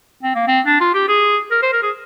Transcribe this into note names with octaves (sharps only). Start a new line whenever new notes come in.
C4
A#3
C4
D4
F4
G4
G#4
A#4
C5
A#4
G#4